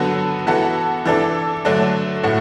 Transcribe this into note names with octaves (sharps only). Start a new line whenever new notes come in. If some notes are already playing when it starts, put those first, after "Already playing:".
Already playing: D3 F#3 B3 F#4 A4
E3 B3 F#4 A4
E3 D4 A4
D3 F#3 A3 D4
A2 A3 F#4